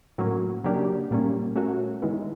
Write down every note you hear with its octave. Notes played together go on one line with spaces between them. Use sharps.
A2 F#3 A#3 C#4
C#3 F#3 A#3 D4 G4
A#2 G3 A#3 C#4
A3 C#4 F#4 A#4
D#3 G#3 B3 E4